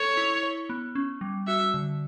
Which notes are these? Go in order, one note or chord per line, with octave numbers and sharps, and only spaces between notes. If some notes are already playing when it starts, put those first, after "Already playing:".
Already playing: A4 C#5
E4
C#5
B3
C#4
G3
F#4 E5
D3